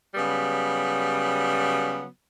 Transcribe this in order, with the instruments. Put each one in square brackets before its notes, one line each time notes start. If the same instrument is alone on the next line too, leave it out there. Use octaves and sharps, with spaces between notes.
[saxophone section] C#3 F#3 G3 B3